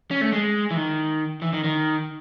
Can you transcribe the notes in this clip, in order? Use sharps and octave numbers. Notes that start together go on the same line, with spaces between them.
C#4
A3
G#3
E3
D#3
E3
D#3
D#3